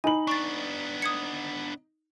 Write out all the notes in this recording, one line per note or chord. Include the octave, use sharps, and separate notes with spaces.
D#4 G#5 B5 F#7
B3 D4 C#6 A6
D#6 G#6 C#7